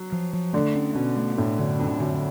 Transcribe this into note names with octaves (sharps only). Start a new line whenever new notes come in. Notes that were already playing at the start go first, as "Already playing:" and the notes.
Already playing: F#3
F3
F3
D3 A3
C#4
B2 C#4
A3
A2 D4
F#2 D3
F2 D4
F#2 D3